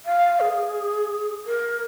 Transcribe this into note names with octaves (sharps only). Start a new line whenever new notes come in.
F5
G#4
A#4